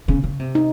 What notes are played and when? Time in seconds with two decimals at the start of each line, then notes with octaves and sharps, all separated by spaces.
0.08 C#3
0.24 C#3
0.40 C3
0.55 D#4